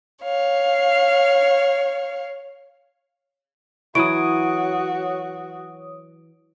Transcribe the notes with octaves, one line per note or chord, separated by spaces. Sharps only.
C#5 F5
E3 F#3 F#4 C#5 D#6 D7